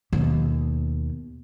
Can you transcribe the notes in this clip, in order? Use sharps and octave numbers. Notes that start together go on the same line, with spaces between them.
D#2 B2